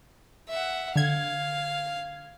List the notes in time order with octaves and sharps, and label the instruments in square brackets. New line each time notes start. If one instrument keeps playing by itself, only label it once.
[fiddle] E5 F#5
[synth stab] D3 G#6 [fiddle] F5